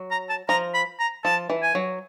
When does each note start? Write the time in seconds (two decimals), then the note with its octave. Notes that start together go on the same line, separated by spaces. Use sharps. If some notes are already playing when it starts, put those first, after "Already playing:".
Already playing: F#3
0.11 A#5
0.30 A5
0.49 F3 A#5
0.74 B5
0.99 A#5
1.25 F3 A5
1.50 E3
1.62 G#5
1.75 F#3